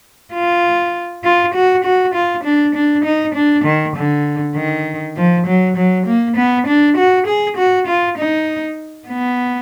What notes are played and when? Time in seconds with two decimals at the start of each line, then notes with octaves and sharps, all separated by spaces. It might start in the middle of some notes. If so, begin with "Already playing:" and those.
0.33 F4
1.24 F4
1.55 F#4
1.84 F#4
2.14 F4
2.44 D4
2.75 D4
3.04 D#4
3.35 D4
3.65 D#3
3.96 D3
4.56 D#3
5.17 F3
5.47 F#3
5.77 F#3
6.07 A#3
6.37 B3
6.67 D4
6.97 F#4
7.27 G#4
7.57 F#4
7.87 F4
8.18 D#4
9.08 B3